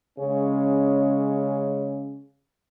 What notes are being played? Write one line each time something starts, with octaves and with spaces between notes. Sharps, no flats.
C#3 G#3 C#4